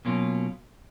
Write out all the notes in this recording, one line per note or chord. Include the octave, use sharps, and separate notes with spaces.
B2 F#3 A#3 C#4 F4